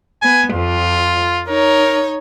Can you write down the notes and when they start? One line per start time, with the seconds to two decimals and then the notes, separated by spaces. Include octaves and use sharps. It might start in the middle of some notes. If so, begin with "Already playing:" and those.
0.22 B3 G#5
0.53 F2 F4
1.48 D#4 A#4 C#5